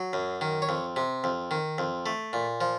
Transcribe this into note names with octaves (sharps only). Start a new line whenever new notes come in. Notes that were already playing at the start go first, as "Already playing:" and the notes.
Already playing: F#3
F#2
D#3
C#5
F2
C3
F2
D#3
F2
A3
A#2
F3